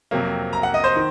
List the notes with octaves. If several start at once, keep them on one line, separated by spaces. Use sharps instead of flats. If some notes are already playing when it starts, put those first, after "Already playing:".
F2 C3 F#3 A#3
A#5
F#5
D#5
C5
D#3